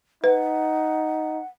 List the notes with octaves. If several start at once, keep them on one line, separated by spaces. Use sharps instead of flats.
D#4 B4 F#5